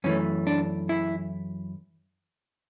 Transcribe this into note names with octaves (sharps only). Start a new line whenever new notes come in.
F#2 E3 A3 C#4
D4
E4